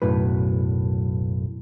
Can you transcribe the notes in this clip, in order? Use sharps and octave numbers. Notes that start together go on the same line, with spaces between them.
B1 F#2 A2 B4